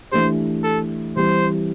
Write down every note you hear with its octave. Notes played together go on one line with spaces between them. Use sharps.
E3 A3 D4 G4 C5
A4
E3 G3 C4 G4 C5